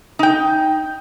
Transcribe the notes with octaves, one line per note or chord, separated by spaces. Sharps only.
D#4 G5